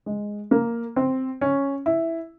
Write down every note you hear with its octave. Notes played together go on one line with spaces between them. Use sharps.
G#3
A#3
C4
C#4
E4